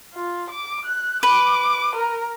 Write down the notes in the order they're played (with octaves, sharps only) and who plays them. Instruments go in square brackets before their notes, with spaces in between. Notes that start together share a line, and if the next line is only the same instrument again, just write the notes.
[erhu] F4
D6
F#6
[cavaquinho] B4 [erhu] D6
[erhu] A#4